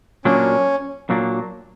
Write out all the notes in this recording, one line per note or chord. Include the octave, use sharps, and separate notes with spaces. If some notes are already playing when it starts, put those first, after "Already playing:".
A#2 F#3 A#3 C#4 D4
A#2 F#3 A#3 D4